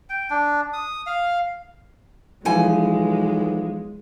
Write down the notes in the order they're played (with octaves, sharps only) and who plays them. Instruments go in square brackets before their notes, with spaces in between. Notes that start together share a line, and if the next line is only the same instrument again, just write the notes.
[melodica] G5
D4
D#6
F5
[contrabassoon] B1 [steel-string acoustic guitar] E3 F3 G#5 [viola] G#3